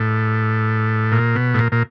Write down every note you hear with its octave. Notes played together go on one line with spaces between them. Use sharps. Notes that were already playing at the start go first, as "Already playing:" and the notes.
Already playing: A2
A#2
B2
A2
A#2
A#2